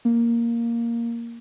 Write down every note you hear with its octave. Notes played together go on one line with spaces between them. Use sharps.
A#3